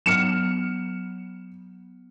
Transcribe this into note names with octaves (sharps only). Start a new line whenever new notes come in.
F#3 B3 F6 C#7 E7